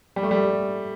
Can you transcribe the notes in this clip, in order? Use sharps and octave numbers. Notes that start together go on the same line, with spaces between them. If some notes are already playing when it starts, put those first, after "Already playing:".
G3
A3
G3